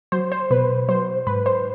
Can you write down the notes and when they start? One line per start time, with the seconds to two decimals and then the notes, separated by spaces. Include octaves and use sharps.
0.12 F#3 C5
0.32 C5
0.50 B2 B4
0.88 F#3 C5
1.27 G#2 B4
1.46 C5